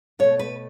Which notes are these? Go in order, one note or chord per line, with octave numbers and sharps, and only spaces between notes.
B2 A3 C#5
B4